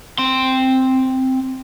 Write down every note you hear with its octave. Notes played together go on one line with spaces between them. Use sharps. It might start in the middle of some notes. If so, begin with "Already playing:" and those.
C4 C6